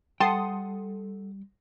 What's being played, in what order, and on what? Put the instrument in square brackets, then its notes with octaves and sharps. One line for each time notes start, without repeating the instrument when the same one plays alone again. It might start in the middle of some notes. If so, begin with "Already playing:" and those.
[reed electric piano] G3 [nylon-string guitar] A4 F#5 [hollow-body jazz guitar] G5 [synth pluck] A5 C6 D#6